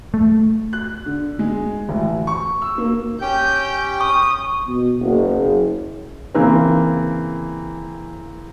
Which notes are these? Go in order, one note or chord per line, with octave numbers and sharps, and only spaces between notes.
A3
F#6
D3
G#3
A1
C#6
E6
A#3
C#4 G4 G5 G6
C#6 D#6
B2
F#1
C#3 E3 A#3 C4